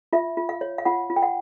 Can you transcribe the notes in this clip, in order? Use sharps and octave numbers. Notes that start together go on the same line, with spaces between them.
F4 E5
F4
F5
C#5
F5
F4 F#5
F4
G5
F#5